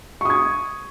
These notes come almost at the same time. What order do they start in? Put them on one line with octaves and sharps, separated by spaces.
C#6 D#6 G#6